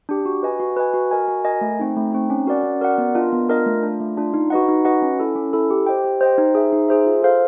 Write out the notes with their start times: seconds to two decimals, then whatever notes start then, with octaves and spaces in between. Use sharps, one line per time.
0.09 D4 G4
0.26 F#4
0.43 B4 D#5 G#5
0.60 F#4
0.77 B4 D#5 G#5
0.94 F#4
1.11 A#4 D#5 G#5
1.28 F#4
1.45 A#4 D#5 G#5
1.61 A3
1.79 C4 D#4
1.96 A3
2.12 C4 D#4
2.30 C#4
2.47 F#4 A#4 D5 F#5
2.63 C#4
2.81 F#4 A#4 D5 F#5
2.98 B3
3.15 D4 F4 A#4 D#5
3.32 B3
3.49 D4 F4 A#4 D#5
3.66 A3
3.83 D4
3.88 F4
4.00 A3
4.17 D4 F4
4.34 D#4
4.50 F#4 B4 D#5 F#5
4.68 D#4
4.85 F#4 B4 D#5 F#5
5.02 C#4
5.20 E4 A4
5.35 C#4
5.53 E4 A4
5.70 G4
5.86 C5 D#5 G5
6.05 G4
6.21 C5 D#5 G5
6.38 D#4
6.55 G#4 C5 E5
6.73 D#4
6.88 G#4 C5 E5
7.07 F4
7.22 A4 C5 F5